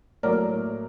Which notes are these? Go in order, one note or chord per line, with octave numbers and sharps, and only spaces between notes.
A2 F#3 A#3 A#4 D5